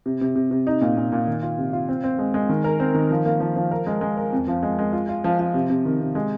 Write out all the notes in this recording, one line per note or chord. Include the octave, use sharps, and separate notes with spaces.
C3
C3
C3
C3
D#4
A#2
A#2
A#2
D#3
F4
C3
F4
C4
C4
G#3
G#3
D#3
A#4
C4
D#3
F3
A#3
F3
F3
A#4
G#3
G#3
A#4
F2
F3
G#3
G#3
F4
F4
F3
F3
C3
C3
D#3
C3
G#3